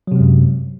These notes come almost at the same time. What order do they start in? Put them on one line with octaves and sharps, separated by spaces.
F#3 C3 G#3 F#2